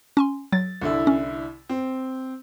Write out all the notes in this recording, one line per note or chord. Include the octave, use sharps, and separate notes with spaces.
C#4 G#5 C6
F#3 A6
C2 D3 E4
C#4
C4